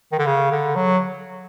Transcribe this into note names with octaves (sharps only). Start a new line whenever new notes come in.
D#3
D3
C#3
D3
F#3